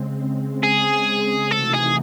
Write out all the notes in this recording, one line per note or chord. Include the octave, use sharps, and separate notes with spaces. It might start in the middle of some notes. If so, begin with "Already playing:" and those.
Already playing: C#3 G#3 C4
G#4
C3 E3 A3 D#4 F#4 A4
G#4